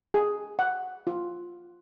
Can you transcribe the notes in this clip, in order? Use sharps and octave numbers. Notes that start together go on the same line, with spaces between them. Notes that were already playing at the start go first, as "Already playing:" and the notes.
G#4
F#5
F4